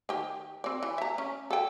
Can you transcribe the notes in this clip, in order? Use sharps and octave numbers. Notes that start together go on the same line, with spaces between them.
D#3 G4
C4 D5
E3
E5 A#5
C#4
A4 G5